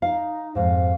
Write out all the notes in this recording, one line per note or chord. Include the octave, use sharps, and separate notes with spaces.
D#4 F5
F2 G#2 F5